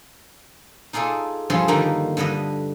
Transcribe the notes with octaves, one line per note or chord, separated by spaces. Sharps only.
D#4 F4 G#4 A4 D5
G2 F3 F4 G#4 A4 C6
D3 D#3 G3 A#3 D#4
G2 D3 B4 D#5